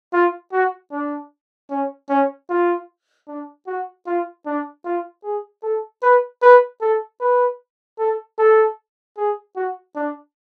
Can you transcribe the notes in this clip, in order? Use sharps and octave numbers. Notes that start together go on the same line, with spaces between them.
F4
F#4
D4
C#4
C#4
F4
D4
F#4
F4
D4
F4
G#4
A4
B4
B4
A4
B4
A4
A4
G#4
F#4
D4